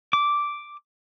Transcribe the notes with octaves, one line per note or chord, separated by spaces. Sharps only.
D6